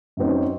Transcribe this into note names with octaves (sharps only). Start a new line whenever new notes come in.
F#2 F#3 C4 D#4